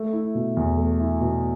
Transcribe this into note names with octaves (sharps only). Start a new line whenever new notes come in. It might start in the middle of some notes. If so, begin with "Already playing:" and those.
Already playing: A3
E4
B2
E2
A3
E4
B2